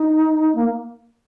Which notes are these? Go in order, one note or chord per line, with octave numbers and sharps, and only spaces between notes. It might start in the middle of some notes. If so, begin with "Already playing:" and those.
Already playing: D#4
A#3